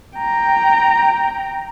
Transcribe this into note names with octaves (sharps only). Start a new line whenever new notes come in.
G5 A#5